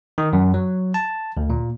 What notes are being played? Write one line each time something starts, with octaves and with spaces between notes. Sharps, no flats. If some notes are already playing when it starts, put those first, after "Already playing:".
D#3
F#2
F#3
A5
D2
A#2